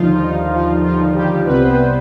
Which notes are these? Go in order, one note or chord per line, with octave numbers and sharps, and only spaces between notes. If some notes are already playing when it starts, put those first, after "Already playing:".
Already playing: D#2 D3 F3 G3 D#4 F4
D#4
F3 F4
F3 F4
G3 G4
C2 C3 G3 B3 B4
C5
B3 B4